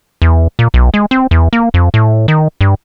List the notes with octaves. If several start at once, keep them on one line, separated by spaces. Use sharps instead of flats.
E2
A#2
B1
G#3
C4
E2
A#3
F2
A2
D#3
G2